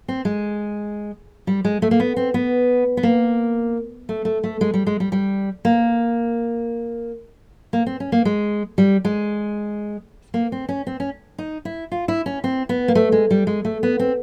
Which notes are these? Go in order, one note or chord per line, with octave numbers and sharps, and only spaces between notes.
C4
G#3
G3
G#3
A3
A#3
B3
C4
B3
B3
A#3
A3
A3
A3
G#3
G3
G#3
G3
G3
A#3
A#3
C4
C#4
A#3
G#3
G3
G#3
A#3
C4
C#4
C4
C#4
D#4
E4
F4
E4
C#4
C4
B3
A#3
A3
G#3
G3
G#3
A3
B3
C4